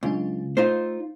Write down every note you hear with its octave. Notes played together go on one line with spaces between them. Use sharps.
C#2 C#3 F#3 D4
A3 D#4 F4 C5